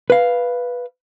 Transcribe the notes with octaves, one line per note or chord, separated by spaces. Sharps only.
B4 F5